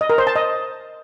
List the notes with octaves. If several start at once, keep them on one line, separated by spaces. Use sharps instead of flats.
D#5
A#4
C5
A5
D#5